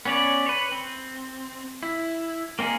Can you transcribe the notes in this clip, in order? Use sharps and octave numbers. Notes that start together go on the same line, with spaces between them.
B3 C#4 C#5 D5
B4 C#5
C4
E4
A#3 C4 D#4 G#4